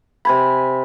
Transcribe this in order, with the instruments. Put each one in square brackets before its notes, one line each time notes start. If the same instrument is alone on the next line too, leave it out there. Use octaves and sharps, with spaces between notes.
[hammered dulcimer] C3 G#5 B5